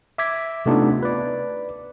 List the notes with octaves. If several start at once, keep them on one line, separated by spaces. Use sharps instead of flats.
E5 D6 G#6 B6
C3 A3 B3 D4 D#4 F4
B4 D5